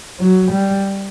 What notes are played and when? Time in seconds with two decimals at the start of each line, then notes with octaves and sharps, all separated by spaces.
0.20 F#3
0.51 G3